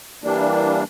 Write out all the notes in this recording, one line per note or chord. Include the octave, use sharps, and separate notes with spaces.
E3 G3 A#3 D4